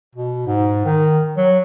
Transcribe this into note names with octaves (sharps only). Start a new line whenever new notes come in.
B2
G#2
D#3
F#3